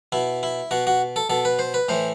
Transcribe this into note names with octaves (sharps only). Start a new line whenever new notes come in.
B2 E4
E4
B2 F#4
F#4
A4
B2 A4
B4
C5
B4
A2 E3 C5